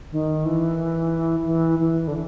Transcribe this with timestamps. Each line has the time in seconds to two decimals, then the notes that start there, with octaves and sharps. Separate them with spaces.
0.12 D#3
0.45 E3
1.45 E3
1.79 E3
2.07 D3